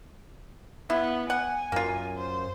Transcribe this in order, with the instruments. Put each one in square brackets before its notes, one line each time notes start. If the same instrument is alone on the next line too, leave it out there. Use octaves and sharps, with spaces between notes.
[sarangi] B3 [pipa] E4
[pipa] F#5 [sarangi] G#5
[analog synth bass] F#2 [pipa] A#3 F4
[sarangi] C5